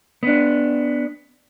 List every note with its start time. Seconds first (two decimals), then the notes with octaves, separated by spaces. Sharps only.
0.23 B3 D4